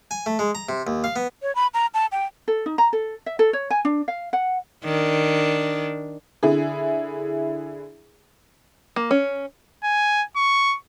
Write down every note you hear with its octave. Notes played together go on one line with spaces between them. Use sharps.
G#5
A3
G#3
A#5
C3
D#2
F5
B3
C#5
B5
A#5
A5
G5
A4
D#4
A#5
A4
E5
A4
C#5
G#5
D4
F5
F#5
D#3 D4
D3 E4 G#4
A#3
C#4
G#5
C#6